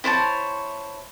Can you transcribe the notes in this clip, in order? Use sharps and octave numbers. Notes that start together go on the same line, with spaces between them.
E4 C5 C#5 A5